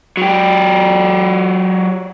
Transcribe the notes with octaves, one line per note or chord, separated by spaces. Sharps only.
F#3 G4